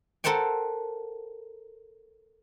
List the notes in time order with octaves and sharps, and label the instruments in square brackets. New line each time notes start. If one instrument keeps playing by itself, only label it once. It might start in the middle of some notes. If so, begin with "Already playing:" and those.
[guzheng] A4 A#4 C5 F#5 G5